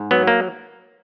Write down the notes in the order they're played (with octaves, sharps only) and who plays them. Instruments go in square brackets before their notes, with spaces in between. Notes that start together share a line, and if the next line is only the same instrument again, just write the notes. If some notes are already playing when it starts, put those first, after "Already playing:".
Already playing: [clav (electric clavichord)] G#2
F#3 B3
A#3